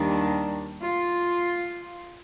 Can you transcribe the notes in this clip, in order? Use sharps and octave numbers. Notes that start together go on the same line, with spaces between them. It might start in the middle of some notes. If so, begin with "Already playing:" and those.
Already playing: D#2 D#3 G3 D4
F4